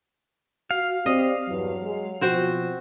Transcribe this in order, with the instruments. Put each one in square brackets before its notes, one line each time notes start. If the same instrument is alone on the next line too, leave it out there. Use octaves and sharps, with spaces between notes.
[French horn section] F#4 [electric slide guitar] F5
[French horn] C4 [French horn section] G4 D5 [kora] D#5
[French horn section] E2 G2 [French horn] F#3
[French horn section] G#3
[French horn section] B2 F3 [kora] C4 F#4 C5